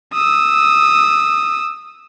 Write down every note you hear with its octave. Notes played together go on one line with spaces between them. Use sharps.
D#6 E6